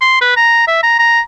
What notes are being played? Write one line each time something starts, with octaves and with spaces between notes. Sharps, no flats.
C6
B4
A#5
E5
A#5
A#5